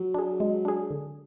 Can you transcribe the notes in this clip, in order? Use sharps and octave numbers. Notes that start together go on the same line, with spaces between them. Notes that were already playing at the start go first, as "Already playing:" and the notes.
Already playing: F#3
D4 G#4
G#3
D4 G#4
D3